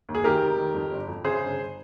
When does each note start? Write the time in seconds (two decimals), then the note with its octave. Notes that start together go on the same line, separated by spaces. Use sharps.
0.09 D#2
0.15 G#4
0.24 D#3 G4 A#4
0.42 F1
0.58 D#3
0.74 F2
0.91 G1
1.08 F2
1.24 C#3 G#4 C5
1.42 G1
1.58 G1